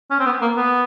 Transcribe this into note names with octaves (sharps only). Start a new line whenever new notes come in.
C#4
C4
B3
A#3
B3